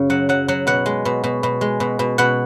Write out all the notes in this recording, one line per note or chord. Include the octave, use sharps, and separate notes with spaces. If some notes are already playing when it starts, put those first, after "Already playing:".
Already playing: F#2 C#3
F#3 F#5
F#3 F#5
F#3 F#5
B2 F#5
G#3
B2
B2
B2
G#3
B2
B2
B2 F#5